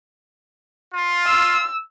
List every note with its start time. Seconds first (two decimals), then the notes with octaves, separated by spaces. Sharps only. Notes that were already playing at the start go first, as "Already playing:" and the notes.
0.94 F4
1.27 E6